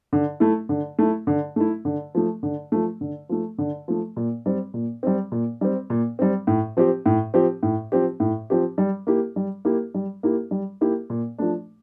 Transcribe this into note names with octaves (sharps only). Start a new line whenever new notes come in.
D3
A3 E4
D3
A3 E4
D3
A3 E4
D3
F3 A3
D3
F3 A3
D3
F3 A3
D3
F3 A3
A#2
G3 C4
A#2
G3 C4
A#2
G3 C4
A#2
G3 C4
A2
F3 C4 G4
A2
F3 C4 G4
A2
F3 C4 G4
A2
F3 C4 G4
G3
A#3 E4 G4
G3
A#3 E4 G4
G3
A#3 E4 G4
G3
A#3 E4 G4
A#2
F3 A3 D4